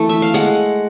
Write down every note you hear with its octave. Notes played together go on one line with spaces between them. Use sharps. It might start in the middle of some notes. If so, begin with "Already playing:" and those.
Already playing: E3 A3
E5
F5
G#3 F#5